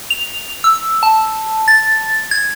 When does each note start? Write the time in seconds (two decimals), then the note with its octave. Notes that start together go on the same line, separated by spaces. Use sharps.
0.10 F7
0.64 E6
1.03 A5
1.68 A6
2.31 G#6